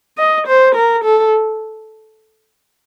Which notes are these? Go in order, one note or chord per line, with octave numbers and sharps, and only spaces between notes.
D#5
C5
A#4
A4